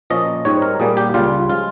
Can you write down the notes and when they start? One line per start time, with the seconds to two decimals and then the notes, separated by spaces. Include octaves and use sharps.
0.10 A#2 F3 A#3 C#4 D#5
0.45 G#2 G3 C4 D#4 C#5
0.62 A#4
0.80 A#2 G3 A#3 G#4
0.97 G4
1.14 C#2 C#3 G3 F4
1.49 F3 G#3 F4